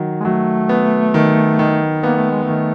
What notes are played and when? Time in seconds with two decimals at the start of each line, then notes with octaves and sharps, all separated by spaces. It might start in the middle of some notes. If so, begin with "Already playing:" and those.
Already playing: D#3 F#3
0.20 G#3
0.24 F#3 A3
0.69 B3
1.14 D#3
1.59 D#3
2.03 A#3 B3
2.17 A3
2.31 G#3
2.43 A3
2.49 D#3